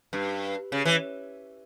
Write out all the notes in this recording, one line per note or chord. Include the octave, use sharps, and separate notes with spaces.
G2
C#3
E3